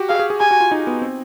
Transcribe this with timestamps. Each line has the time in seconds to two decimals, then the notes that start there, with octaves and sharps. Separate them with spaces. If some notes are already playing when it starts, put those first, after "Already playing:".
Already playing: F#4 G4
0.09 G#4 F5
0.19 G#4
0.30 G#4
0.40 G4 G#5
0.51 F#4
0.60 F4
0.72 D#4
0.87 B3
1.02 C4